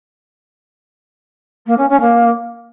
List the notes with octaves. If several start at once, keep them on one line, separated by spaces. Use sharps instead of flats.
A#3
C#4
C#4
A#3